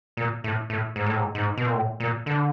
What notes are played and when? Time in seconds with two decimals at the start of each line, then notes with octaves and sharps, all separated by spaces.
0.17 A#2
0.44 A2
0.70 A2
0.96 G#2
1.06 A2
1.16 G#2
1.35 G#2
1.57 B2
1.66 A#2
1.74 A2
2.00 A#2
2.26 D3